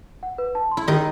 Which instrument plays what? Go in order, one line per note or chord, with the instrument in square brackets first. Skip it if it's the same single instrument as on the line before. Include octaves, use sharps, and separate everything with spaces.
[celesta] F#5
B4
A5
C6
[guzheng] E4
[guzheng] D#3 D#4 [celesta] G4